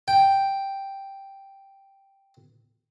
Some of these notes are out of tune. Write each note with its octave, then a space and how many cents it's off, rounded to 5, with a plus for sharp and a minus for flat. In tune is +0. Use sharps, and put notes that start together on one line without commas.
G5 +0